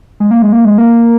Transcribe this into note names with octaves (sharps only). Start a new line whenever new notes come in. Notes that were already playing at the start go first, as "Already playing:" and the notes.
G#3
A#3
G#3
A#3
G#3
A#3